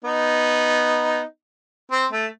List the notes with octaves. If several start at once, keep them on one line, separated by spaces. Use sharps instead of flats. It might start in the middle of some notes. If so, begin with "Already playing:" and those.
B3 D#4
C4
A3